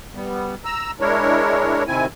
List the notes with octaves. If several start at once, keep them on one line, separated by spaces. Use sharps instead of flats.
G3 B3
A#5 E6
G#3 D4 E4 A#4 C#5
C3 D#3 C4 E4 G#5